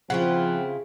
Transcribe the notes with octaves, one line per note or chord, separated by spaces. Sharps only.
C#3 F3 C4 E4 F4 F#5